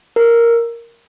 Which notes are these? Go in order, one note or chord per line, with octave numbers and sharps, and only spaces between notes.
A#4